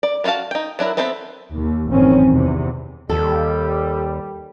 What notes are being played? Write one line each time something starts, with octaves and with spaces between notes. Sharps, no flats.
D5
B3 F4 F#4 F5 A5
D#4 G5
F#3 D4 E4 A#4
B3 C4 A4 C5 E5
D#2
A1 F#2 D#3 C4 C#4
E2 C3
D#2 G3 A4